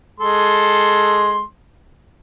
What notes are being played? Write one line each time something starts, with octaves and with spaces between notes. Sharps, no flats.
G#3 A4 C6